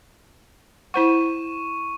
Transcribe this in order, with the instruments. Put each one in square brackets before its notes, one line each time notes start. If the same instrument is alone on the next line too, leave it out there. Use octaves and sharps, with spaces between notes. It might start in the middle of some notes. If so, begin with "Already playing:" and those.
[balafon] E4 C5 F#5 [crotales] C#6 D#7 E7